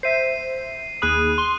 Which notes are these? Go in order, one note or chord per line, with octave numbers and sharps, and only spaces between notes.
C5 E5 C7 D#7
D#2 G#4 B5 D#6 F#6 D#7
C6